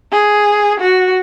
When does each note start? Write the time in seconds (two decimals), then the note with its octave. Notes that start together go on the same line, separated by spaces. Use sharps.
0.12 G#4
0.80 F#4